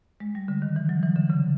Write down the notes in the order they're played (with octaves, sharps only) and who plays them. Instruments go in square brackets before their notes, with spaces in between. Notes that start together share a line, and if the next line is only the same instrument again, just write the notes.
[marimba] G#3
G3
D3
D#3
E3
F#3
E3
D3
C#3